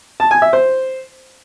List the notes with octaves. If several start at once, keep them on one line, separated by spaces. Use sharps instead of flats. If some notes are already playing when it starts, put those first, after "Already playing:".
A5
G#5
E5
C5